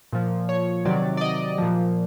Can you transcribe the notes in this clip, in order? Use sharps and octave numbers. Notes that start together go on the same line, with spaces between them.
A#2 F3
C#5
C3 D#3 F#3 D5
D5
D#5
A#2 F3